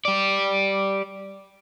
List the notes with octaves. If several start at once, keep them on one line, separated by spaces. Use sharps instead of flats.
G4 D5